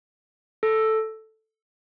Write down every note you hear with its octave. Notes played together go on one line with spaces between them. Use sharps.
A4